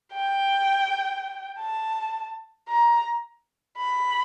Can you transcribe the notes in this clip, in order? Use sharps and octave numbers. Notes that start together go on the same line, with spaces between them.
G5
A5
A#5
B5